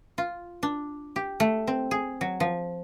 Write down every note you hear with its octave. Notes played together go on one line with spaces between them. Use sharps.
F4
D4
G4
A3
C4
G#4
F#3
F3